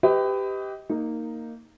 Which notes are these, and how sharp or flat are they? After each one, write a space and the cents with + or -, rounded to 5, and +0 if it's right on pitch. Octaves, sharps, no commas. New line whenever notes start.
G4 +0 B4 +30 D#5 +25
A#3 -10 D#4 +0